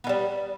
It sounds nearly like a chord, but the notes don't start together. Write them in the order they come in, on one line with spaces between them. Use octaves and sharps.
B3 D#3 G3